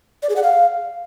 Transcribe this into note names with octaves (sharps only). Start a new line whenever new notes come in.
D5
G#4
F#5
F5